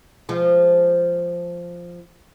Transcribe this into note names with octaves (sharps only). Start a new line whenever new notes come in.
F3 G#3